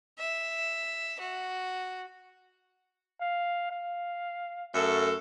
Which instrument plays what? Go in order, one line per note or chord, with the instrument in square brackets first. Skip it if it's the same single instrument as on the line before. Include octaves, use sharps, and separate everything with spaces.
[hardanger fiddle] E5
F#4
[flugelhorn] F5
F5
[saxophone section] F#2 A3 A4